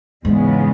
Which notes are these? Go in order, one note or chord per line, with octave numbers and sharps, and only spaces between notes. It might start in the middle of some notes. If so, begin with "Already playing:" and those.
E2 G#2 C#3 G#3 B3